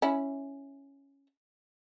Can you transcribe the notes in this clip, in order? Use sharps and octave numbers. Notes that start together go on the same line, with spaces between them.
C#4 E4